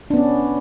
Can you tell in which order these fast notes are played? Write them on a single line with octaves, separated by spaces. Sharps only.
D4 B3 C#4